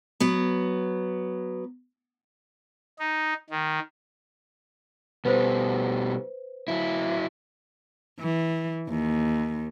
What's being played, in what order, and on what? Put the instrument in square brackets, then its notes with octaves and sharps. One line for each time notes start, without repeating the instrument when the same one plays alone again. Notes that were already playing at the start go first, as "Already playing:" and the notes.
[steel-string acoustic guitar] F#3 B3
[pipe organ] D#4
D#3
[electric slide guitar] B2 G3 [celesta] B4 C5
[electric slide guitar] F#3 E4
[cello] E3
D#2